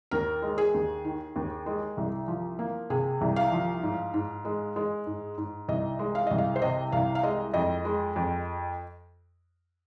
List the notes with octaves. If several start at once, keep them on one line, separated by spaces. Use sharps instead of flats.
D#2 A#4
G#3
G#4
D#2
D#3
D#2
G#3
C2
F3
A#3
C3 G#4
C2
F5
F3
G#2
G#2
G#3
G#3
G#2
G#2
C2 D#5
G#3
F5
C2 D#5
F5
C5
C3 D#5
C2 F5
F5
G#3 D#5
F2 D#5
G#3
F2